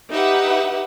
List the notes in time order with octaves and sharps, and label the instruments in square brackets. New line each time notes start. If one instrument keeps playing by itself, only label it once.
[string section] D#4 G4 B4 E5 F#5